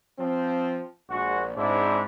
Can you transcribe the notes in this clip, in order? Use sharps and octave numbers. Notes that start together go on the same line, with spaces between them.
F3 C4
A#1 G#3 F#4
G#2 C4 D4 E4